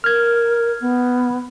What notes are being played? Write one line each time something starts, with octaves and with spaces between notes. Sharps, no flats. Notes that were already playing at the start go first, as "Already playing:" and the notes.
A#4 F6 G#6
B3